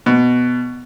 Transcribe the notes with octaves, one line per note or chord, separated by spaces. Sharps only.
B2